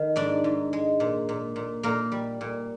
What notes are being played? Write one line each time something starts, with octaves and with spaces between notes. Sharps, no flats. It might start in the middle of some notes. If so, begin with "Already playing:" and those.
Already playing: D#3
G#2 D4 D5
G#2
G#3
A#2
A#2
A#2
A#2 A#3 A#4
G3
A#2